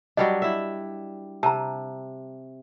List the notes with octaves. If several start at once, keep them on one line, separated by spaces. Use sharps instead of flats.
F#3 G3 D4 D#5
E4 E5
C3 A5 A#5